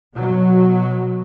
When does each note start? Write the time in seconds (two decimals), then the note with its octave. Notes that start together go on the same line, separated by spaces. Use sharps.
0.14 B2 F#3